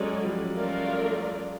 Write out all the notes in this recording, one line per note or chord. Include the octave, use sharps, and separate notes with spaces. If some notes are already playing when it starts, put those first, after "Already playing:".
Already playing: F#3 G#3 C#4 F#4 A4 D5
F3 G3
A3 C#4 F4 A#4 D5